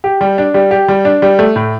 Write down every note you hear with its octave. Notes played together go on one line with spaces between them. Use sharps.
G4
G3
D4
G3
G4
G3
D4
G3
A3
A2